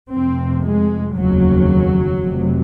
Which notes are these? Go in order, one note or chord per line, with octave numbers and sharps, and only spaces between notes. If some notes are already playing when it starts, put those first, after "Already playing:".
F1 F2 C3 C4
G#3
F1 D#2 C#3 F#3
F1 F2 C3